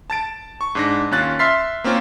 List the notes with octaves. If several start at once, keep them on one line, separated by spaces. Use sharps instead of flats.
A5 A6 D7
C#6
G#2 D4 A#6
D#2 C#4 F4 F#6 A6
E5 C6 F6 A6 B6 C7
A#3 C4 C#4 F4